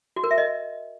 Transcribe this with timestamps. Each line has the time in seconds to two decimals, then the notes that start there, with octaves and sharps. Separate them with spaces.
0.16 F#4
0.24 A#4
0.31 E5
0.38 D#5